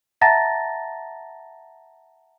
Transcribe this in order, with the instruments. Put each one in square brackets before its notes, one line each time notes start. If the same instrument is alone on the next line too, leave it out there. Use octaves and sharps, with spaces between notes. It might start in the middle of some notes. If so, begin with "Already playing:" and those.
[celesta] E5 F#5 A5 A#5 A6 A#6